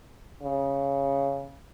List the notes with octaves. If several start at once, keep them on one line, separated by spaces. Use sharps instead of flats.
C#3